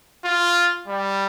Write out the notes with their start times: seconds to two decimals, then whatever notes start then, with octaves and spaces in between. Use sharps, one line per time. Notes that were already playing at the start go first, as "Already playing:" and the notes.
0.25 F4
0.88 G3